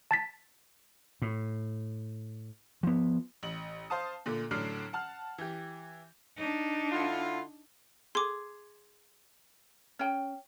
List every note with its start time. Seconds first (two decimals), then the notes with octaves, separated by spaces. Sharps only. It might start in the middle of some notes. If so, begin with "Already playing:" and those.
0.11 A5 A6 B6
1.22 A2
2.83 F3 B3
3.43 A1 F#7
3.90 C5 F5 A5 D#6
4.26 A#2 D3 A3
4.51 A2 D3 F#3 D4 F6 C7
4.93 F#5 A5 F6
5.38 E3 G4
6.37 D4 D#4
6.92 D3 E4 F4
8.15 G#4 C6 D6
9.99 C#4 G5